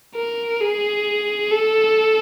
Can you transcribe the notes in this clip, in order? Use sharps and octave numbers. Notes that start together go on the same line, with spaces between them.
A#4
G#4
A4